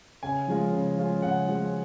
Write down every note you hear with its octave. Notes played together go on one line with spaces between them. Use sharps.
C#3 G#5
F3 G#3 C#4 F4
C#3
F3 G#3 C#4 F4
C#3 F#5
F3 G#3 C#4 F4